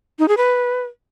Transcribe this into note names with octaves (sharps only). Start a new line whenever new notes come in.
D#4
G#4
B4